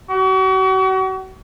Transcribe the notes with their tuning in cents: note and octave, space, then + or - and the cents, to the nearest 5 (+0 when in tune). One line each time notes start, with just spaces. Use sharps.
F#4 +40